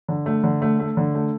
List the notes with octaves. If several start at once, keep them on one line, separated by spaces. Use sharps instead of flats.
D3
A3
D3
A3
A3
D3
A3